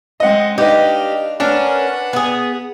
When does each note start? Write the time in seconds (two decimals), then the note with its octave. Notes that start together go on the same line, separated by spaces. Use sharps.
0.20 G#3 C4 D#5 F#5
0.58 D4 D#4 G4 B4 D#5 F5
1.40 C#4 D4 A#4 B4 F#5
2.13 B3 G#4